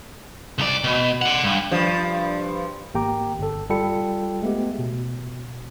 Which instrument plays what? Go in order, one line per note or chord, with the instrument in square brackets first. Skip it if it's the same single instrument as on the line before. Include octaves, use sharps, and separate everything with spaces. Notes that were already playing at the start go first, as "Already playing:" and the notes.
[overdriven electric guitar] C2 D5
B2
D5 F#5
G2
[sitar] G2 F3
[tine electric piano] G#1 A#3 G4 G5 A#5 D6
G1 A4
G3 F4 A4 G5 B5 C#7
G#3 A3 B3 G4
B2